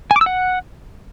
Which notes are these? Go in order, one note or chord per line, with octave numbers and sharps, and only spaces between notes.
G#5
D6
E6
F#5